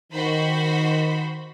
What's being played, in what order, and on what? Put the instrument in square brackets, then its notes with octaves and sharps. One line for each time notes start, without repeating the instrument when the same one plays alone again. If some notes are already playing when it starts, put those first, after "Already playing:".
[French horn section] D#3 [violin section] F#4 C5 B5